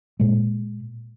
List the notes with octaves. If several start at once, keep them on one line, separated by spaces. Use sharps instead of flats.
A#2 G#3